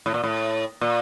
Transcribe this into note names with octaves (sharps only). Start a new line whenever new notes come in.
A2
A#2
A2
A#2